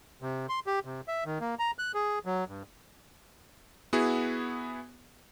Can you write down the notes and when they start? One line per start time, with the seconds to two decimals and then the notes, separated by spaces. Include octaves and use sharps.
0.22 C3
0.49 C6
0.67 G4
0.85 C3
1.08 E5
1.26 D#3
1.41 A#3
1.59 A#5
1.79 F#6
1.94 G#4
2.26 F#3
2.48 G2
3.93 B3 E4 F#4 G#4